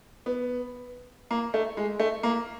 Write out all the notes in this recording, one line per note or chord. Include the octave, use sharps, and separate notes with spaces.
B3
A#3
A3
G#3
A3
A#3